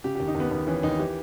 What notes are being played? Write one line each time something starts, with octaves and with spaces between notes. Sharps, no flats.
C#3 G4
D#2 G4
D#4
D#2
B3
D#2 B3
E3 C#4
D#2 D#4
E3 G4